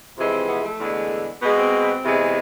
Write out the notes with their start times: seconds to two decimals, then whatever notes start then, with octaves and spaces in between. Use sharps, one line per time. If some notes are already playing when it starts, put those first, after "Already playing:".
0.17 F2 C3 E3 G#3 C4
0.32 C4
0.48 B3
0.63 A3
0.79 E2 D3 G#3
1.41 B2 G#3 B3
1.57 C4
2.04 E2 C3 G#3